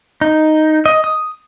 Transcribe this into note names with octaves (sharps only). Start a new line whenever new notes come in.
D#4
D#5
D#6